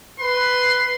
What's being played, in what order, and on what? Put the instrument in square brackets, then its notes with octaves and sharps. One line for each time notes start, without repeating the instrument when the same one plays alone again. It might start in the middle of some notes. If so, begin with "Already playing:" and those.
[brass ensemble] B4 [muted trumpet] C6